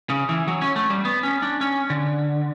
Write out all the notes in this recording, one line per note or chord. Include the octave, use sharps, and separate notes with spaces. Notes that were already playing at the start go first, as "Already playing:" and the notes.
C#3
E3
F#3
C#4
A3
G3
B3
C#4
D4
C#4
D3